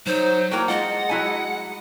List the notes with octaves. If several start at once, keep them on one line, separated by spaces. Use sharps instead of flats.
F#3 D#4 C5 C#5
F#3 A#3 E4 G5
G#3 F4 D#5 F#5
F#3 E4 G#5